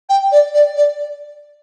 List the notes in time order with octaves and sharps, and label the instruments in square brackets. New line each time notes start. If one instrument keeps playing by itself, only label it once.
[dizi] G5
D5
D5
D5